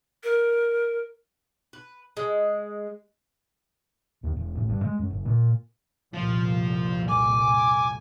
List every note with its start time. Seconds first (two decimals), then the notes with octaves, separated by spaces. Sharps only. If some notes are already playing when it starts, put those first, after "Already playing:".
0.24 A#4
1.73 B4
2.17 G#3
4.23 D#2
4.37 E1
4.55 A1
4.69 G2
4.85 G#3
4.99 F#2
5.11 F#1
5.26 A#2
6.14 C2 F2 A#2 F3
7.09 G#5 D6